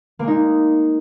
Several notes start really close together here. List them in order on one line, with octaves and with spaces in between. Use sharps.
A#3 G#3 D#4